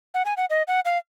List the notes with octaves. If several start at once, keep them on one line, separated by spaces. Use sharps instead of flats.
F#5
G#5
F#5
D#5
F#5
F5